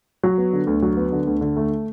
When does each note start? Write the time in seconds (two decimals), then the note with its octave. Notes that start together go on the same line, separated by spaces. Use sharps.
0.23 F#3
0.38 B3
0.53 D3
0.67 D2
0.82 F#3
0.97 B3
1.12 D3
1.27 D2
1.41 D3
1.57 A3